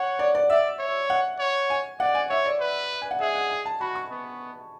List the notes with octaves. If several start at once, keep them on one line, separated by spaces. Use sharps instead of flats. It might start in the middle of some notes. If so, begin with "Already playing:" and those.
Already playing: C#5 F#5
D5
D5
D5 E5
C#5
F#5
C#5
G#5
D5 F#5
G#5
C#5 E5
D5
B4
G#5
F#5
G#4 E5
F#5
G#5
A5
F#4 B5
C#6
B3